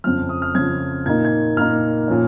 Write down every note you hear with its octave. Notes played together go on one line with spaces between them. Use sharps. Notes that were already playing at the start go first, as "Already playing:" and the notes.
F2 C#3 F3 F6
D#6
F6
F2 C#3 F3 G#6
A#2 A#3 D#4 G#6
G#6
A#2 A#3 D#4 F6
A#2 F3 C#4